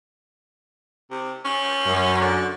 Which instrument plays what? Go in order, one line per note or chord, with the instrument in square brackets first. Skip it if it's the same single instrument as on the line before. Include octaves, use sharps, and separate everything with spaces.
[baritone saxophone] C3
C#4
[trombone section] F#2
[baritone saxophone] D3